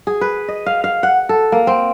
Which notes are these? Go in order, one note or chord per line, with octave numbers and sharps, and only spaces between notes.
G#4
B4
D#5
F5
F5
F#5
A4
A#3
C4